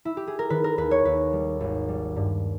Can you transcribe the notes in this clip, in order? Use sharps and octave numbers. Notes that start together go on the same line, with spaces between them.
E4
G4
G#4
A#4
D#3 B4
A#4
D#2 B4
C#5
D#2 B4
G3
G#1
G3
G2